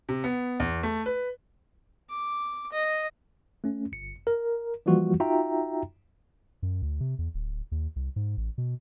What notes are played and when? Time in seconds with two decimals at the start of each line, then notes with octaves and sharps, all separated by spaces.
0.09 C3
0.24 B3
0.60 E2
0.83 A3
1.06 B4
2.10 D6
2.73 D#5
3.64 A3 C#4
3.92 G1 C#7
4.27 A#4
4.86 E3 F3 G3 A#3 F4 F#4
5.20 D#4 F4 F#4 E5 G5 A#5
6.63 F#2
6.82 D2
7.00 C3
7.19 E2
7.34 D1
7.72 D#2
7.96 C2
8.16 G#2
8.37 A1
8.58 B2